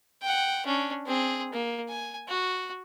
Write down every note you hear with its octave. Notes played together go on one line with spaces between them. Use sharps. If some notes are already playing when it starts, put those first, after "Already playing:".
F#5 G5
C#4 D4
C4 G#4
A#3
G#5
F#4